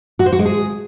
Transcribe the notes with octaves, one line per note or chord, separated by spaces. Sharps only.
F#4
C5
F#4
G#3
G#4